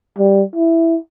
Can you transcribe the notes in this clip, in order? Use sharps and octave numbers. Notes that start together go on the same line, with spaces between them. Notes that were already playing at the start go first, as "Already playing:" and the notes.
G3
E4